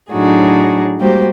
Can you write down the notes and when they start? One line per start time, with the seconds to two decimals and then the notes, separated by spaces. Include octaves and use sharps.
0.12 A2 F#3 D4 D#4 F#4 G#4
0.98 G3 G#3 A#3 F#4 G4 C5